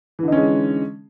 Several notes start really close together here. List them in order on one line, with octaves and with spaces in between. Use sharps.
E3 D3 D#4 C#4 G#3